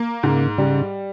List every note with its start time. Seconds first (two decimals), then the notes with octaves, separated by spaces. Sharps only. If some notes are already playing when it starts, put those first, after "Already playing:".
Already playing: A#3
0.23 G#2 C#3
0.58 C#3 G3